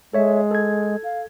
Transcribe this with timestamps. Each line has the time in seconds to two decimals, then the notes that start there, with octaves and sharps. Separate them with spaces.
0.13 G#3 A4 C#5 E5
0.51 A4 G#6
1.04 F5